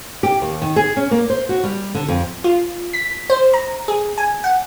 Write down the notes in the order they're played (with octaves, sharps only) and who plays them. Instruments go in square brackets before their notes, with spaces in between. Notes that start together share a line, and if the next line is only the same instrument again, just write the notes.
[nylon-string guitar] G4
D#2
D#3
G#4
C#4
A#3
C5
F#4
G3
D3
F2
[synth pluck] F4
B6
C5
A#5
G#4
G#5
F#5